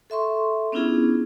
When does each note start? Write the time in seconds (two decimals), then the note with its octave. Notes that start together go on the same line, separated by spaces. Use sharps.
0.10 A4 E5 C6 C#6
0.72 B3 C#4 D4 E4 F4 G#4